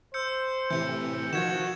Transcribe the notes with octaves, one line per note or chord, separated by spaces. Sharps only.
C5 E6 G6 C#7
A2 C3 E3 G6 C#7
D#3 F3 F#4 G#6 E7